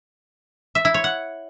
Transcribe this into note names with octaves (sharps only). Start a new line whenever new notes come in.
E5
E4
C#5
F#5